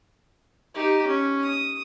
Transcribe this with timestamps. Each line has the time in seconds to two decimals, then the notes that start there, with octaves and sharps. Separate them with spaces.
0.75 D#4 G4
1.07 C#4
1.44 D#6